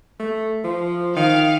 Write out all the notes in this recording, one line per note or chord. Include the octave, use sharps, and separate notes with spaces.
A3
F3
D#3 F5